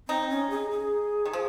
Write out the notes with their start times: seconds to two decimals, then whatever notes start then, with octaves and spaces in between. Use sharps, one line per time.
0.08 C4 D#4
0.30 C#4
0.50 G#4
0.71 G#4
1.25 D#3
1.33 F3